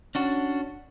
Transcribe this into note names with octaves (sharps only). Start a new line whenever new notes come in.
C#4 D4 F#4